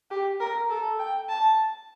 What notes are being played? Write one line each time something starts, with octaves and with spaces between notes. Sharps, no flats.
G4
A#4
A4
G5
A5